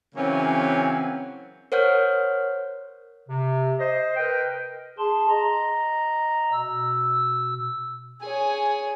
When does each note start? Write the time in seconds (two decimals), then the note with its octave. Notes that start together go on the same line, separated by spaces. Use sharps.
0.15 C#3 E3 F#3 A#3 C4 C#4
1.72 A#4 C5 C#5 F#5 F6 G6
3.29 C3
3.79 C5 D#5
4.16 A#4 B4 D#5 G5
4.98 G#4 A5 C6
5.30 D#5 A#5
6.53 B2 E6
8.22 G#4 C#5 G#5